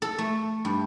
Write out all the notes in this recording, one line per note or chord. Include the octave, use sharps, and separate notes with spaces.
A4
A3
G2